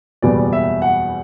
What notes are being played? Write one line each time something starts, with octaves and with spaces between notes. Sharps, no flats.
F#1 E2 B2 G3 B3 D5
E5
F#5